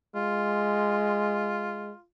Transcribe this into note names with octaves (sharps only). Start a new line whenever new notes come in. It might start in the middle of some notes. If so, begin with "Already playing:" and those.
G#3 F4